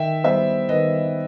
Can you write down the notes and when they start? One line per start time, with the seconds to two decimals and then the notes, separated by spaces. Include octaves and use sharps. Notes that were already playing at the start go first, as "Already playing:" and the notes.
Already playing: D#3 E5 G5
0.24 G3 B3 C5 E5
0.69 D#3 B4 D#5